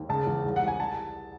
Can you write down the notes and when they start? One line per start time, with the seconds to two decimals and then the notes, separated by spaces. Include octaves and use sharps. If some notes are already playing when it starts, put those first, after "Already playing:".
Already playing: D#2
0.09 C#3 A5
0.27 E2
0.45 C2
0.56 F#5
0.62 C2
0.68 G#5
0.80 A5